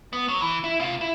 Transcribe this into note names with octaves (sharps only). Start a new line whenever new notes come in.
B3
F#3 C#5
E3
E4
C3 F4
E4